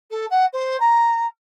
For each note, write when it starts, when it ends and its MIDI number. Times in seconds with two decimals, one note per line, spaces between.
0.11 0.26 69
0.30 0.46 78
0.53 0.77 72
0.80 1.27 82